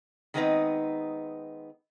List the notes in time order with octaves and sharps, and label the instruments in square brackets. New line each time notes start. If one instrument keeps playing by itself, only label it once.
[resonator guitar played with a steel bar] D#3 G#3 B3 C4 D#4 B4